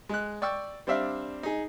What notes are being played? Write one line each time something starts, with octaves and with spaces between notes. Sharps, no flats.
G#3 F#6
D5 G5 C#6 E6
G3 C4 D4 E5 F5
D#4 G#4